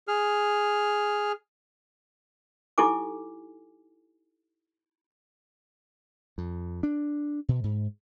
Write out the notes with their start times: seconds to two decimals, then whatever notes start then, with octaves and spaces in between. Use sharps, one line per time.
0.08 G#4 F6
2.78 D#4 E4 G4 A4 G#5 D6
6.38 F2
6.83 D4
7.49 B2
7.64 G#2